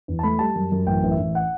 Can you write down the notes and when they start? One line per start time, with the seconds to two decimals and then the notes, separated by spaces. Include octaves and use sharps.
0.08 E2
0.19 A5
0.23 A3 B5
0.39 G3 A5
0.56 F#2
0.72 F#2
0.87 A1 G5
1.03 A1
1.11 E5
1.19 A1
1.35 F#5